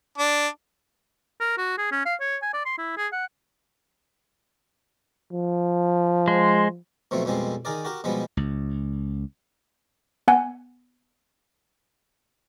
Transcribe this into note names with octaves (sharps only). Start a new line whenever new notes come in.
D4
A#4
F#4
G#4
C#4
F5
C#5
G#5
D5
C6
E4
G#4
F#5
F3
G#3 C5
B2 F3 F#3 A3 C4
F2 B2 F3 G3 G#3 C4
D#3 G#4 A#4 D5
F#4 G4 A#4
B2 F3 G3 G#3 B3
C#2
B3 F#5 G#5